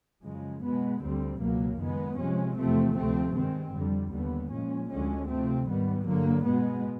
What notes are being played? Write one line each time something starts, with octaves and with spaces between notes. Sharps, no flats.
F#2 C#3 F3 G#3
B2 G#3 B3
D2 D3 G3 C4
C#2 B2 F#3 A#3
F#2 D#3 G#3 B3
C3 F3 G#3 C#4
E2 C3 F3 A3 C4
D2 C3 F3 A3 C4
G2 D#3 G#3 C4
F2 D3 G3
D#2 D3 G3 B3
A#2 F3 G#3 C#4
D2 D3 F3 G#3 C#4
C3 F3 A3 C4
G#2 D#3 G3 B3
G2 D3 F#3 A#3
B2 G#3 B3